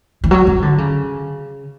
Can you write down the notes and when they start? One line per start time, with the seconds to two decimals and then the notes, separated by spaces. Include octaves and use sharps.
0.24 E3
0.31 F#3
0.47 F#3
0.62 D3
0.78 C#3